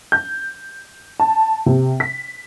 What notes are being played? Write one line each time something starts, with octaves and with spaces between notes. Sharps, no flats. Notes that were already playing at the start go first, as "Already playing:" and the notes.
G6
A5
C3
B6